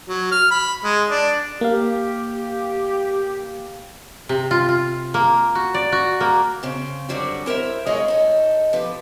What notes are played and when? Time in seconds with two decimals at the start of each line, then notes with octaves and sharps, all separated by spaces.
0.09 F#3
0.32 F6
0.51 B5
0.84 G#3
1.10 D4
1.61 A#3 G4 F5
4.29 C3
4.51 F4
4.69 F4
5.14 A#3
5.55 F#4
5.74 D5
5.92 F#4
6.20 A#3
6.63 C#3 C4
7.09 F#2 D3 G3 C4 F#4
7.46 E4 A#4 C5 E5
7.86 G2 G#3 G#4 C#5 D#5
8.08 D#4 A4
8.73 F3 G4 B4